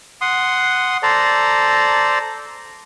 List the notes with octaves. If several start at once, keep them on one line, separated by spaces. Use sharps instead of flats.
F#5 C6 D#6
A4 C5 D5 A#5